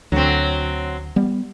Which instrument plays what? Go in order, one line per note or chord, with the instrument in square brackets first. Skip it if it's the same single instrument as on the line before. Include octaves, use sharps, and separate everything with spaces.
[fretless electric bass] D2 [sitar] F#3 C4
[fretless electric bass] G3 B3